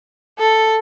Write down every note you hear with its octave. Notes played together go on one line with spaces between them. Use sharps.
A4